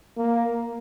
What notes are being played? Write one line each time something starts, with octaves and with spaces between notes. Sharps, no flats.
A#3